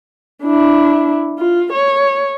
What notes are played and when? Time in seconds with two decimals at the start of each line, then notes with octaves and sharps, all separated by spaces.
0.43 D4 E4
1.39 F4
1.73 C#5